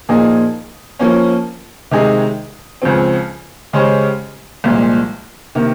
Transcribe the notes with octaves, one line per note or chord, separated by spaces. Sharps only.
A#2 F3 A#3 D#4 G#4
F3 A#3 C#4
C3 D#3 G#3 D#4 G#4
C#2 C#3 F3 C4
C#3 G#3 C#4 G4 C5
C2 A#2 F3 G#3
C3 D#3 A#3